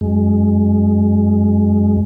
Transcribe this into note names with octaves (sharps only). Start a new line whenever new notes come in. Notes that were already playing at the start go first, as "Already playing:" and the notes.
F#2 G#3